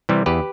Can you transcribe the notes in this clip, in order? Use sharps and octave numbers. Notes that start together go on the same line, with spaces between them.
C3 E3 G3
E2 G4 B4